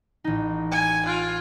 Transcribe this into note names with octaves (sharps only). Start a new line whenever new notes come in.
A1 D#4
G#5
F4 F#6 D7